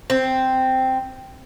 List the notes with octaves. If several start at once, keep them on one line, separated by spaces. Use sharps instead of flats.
C4